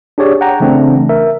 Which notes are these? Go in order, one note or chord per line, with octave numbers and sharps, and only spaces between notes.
D4 G4 G#4 C#5 D5
F#5 G5 A#5
C#3 E3 A3 C4 D4
A#4 E5